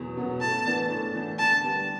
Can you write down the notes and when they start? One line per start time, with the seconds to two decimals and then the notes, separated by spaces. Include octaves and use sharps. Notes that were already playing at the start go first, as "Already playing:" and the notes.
Already playing: E2 B2 F#3 B3
0.17 B2 F#3 B3
0.41 A2 A5
0.66 E3 B3 D4
0.90 A2
1.14 E3 B3 D4
1.39 D3 A5
1.64 G3 B3 D4